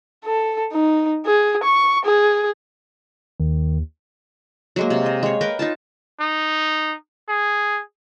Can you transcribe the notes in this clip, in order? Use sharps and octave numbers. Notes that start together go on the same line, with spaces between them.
A4
D#4
G#4
C#6
G#4
D#2 D#3
F#3 G#3 A#3
C3
D#5
G#3 C#5
A#4 B4 F5 G5
D#4 F4 A5
D#4
G#4